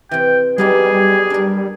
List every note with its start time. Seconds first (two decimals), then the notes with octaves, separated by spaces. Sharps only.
0.11 C3 E3 G5
0.58 F#3 G3 B3 D#4 G4 G#4
1.30 D4 A#4